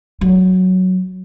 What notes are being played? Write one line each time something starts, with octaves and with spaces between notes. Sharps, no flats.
F#3